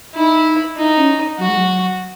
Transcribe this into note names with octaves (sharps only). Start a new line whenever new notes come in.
D#4 E4
D#4 E4
C#4
F#3 F#4
G#3
F#3